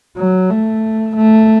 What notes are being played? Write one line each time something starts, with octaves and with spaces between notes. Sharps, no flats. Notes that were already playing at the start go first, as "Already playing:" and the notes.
F#3
A3
A3